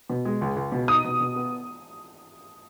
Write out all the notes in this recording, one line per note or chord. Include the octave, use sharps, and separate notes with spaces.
B2
G#3
C#2
C#2
B2
D#4 D#6
B2
B2
B3